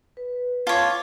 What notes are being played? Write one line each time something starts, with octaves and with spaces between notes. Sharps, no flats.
B4
F4 C#5 A5 D6